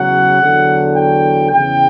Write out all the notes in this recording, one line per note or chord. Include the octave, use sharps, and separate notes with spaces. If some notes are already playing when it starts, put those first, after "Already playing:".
Already playing: E2 C#3 F#3 F#5
E2 D3 F#3
G5
E2 C#3 E3 G5